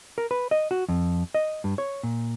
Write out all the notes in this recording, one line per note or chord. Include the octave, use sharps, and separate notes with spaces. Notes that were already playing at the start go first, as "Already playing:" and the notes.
A#4
B4
D#5
F#4
F2
D#5
G2
C#5
A#2